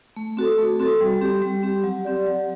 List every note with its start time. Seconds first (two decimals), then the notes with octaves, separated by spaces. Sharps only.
0.16 A3
0.37 C4 F#4 A4
0.58 A3
0.79 C4 F#4 A4
1.01 G3
1.21 C4 G4
1.42 G3
1.63 C4 G4
1.84 F#3
2.05 C4 G4 D5
2.26 F#3